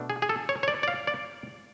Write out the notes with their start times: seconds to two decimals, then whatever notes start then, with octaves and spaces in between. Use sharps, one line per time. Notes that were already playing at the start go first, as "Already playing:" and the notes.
Already playing: B2 A3 D4
0.10 G#4
0.22 G#4
0.29 A4
0.49 C#5
0.63 C#5
0.68 D5
0.83 D5
0.88 F5
1.07 D5